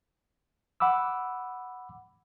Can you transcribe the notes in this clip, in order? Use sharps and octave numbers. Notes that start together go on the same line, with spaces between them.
F#5 B5 D6 E6